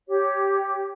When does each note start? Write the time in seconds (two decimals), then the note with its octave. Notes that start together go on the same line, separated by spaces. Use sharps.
0.08 G4 C#5